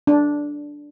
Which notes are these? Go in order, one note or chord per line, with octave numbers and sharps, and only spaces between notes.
D4